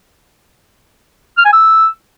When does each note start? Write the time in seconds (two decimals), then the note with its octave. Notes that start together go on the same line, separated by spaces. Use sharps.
1.38 F6
1.45 G#5
1.53 E6